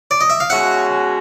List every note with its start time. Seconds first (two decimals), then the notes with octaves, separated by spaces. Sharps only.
0.11 D5
0.21 D#5
0.30 E5
0.40 F5
0.50 B2 G#3 C#4 F#4 E5 F#5